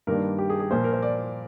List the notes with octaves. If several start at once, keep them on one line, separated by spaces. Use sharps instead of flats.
G2 D#3 G3 A#3 D4 A#4
G4
G#4
G#4
A#2 F3 A#3 C5
A#4
C5
D5